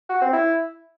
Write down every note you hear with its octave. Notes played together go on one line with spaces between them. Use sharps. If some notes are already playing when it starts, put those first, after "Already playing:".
F#4
C4
E4